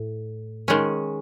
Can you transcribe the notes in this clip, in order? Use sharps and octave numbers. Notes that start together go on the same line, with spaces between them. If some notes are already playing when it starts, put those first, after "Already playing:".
Already playing: A2
D#3 G#3 C#4